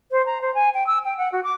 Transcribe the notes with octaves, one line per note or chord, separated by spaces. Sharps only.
C5
A#5
C5
G#5
G5
E6
G5
F#5
F#4
D6